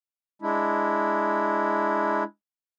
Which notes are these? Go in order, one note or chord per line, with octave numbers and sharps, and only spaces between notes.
G#3 D4 E4